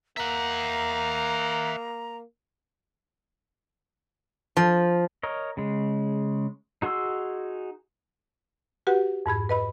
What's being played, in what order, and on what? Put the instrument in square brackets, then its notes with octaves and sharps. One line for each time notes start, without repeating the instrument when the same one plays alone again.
[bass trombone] A#3 [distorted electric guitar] E5 F#5 [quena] A#5
[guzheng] F3
[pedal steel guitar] A#4 C#5 D#5
C#3 G#3
D#4 F#4 G#4 C6 E6
[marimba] F#4 G4 B4 F#5
F2 G#2 B5 G#6
B4 D#5 B5